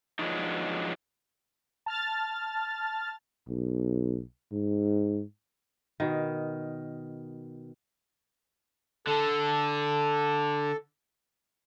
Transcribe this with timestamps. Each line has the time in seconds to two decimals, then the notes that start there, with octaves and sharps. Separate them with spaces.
0.19 F3 F#3 G#3 B3 D4 D#4
1.86 A5 F6 A6
3.49 B1
4.53 G#2
6.00 B2 D#3
9.08 D3 A4